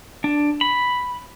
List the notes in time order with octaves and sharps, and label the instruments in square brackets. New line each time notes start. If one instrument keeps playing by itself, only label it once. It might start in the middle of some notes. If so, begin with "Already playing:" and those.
[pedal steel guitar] D4
B5